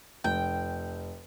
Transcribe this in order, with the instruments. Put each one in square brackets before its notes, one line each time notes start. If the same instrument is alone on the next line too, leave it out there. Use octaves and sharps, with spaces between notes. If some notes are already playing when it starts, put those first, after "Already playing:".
[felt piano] F1 [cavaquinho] G5